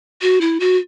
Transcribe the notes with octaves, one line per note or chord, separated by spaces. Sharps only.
F#4
E4
F#4